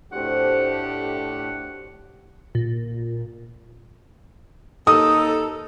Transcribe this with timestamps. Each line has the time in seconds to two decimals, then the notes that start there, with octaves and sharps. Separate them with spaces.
0.12 A2 A3 C4 D4 F#4 G4 C#5 F#5
2.55 A#2
4.87 D#2 D#4 A4 D#6